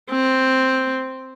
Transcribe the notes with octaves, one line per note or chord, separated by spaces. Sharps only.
C4